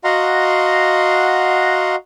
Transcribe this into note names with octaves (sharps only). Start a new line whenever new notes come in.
F#4 D#5 F5 F#5 A#5 C6